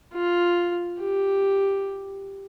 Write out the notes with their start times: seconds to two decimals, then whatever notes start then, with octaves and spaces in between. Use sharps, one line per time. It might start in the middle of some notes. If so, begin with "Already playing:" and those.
0.14 F4
1.00 G4